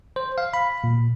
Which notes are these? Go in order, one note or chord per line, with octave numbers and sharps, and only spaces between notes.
C5
F5
B5
A#2